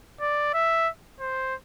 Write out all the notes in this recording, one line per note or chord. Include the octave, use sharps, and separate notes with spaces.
D5
E5
C5